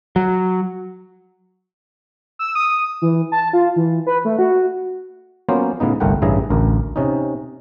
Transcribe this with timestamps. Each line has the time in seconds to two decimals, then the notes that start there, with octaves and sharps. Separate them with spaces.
0.16 F#3
2.39 E6
2.55 D#6
3.02 E3
3.32 A5
3.53 F4
3.76 E3
4.06 B4
4.25 A3
4.39 F#4
5.49 F#3 A#3 B3 C#4 F4 C5
5.80 A2 C#3 B3 D#4
6.00 G1 C2 A3 A#4 F#5 G5
6.22 A1 G2 C#3 E4 G#4 A#5
6.50 A1 D2 A#4
6.96 C3 C#4 D#4